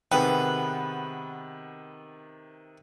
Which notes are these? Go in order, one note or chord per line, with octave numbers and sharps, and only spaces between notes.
C3 D#3 B3 G#4 B4 G5